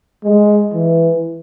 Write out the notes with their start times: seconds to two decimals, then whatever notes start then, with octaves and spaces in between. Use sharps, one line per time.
0.24 G#3
0.74 E3